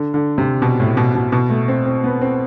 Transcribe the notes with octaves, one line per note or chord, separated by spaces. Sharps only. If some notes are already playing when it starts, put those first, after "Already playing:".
Already playing: D3
D3
C3
B2
A2
B2
B2
B2
A3
C4
C4
B3
C4